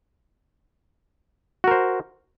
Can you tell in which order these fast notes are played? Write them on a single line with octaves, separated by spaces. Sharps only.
F#4 A#4 C5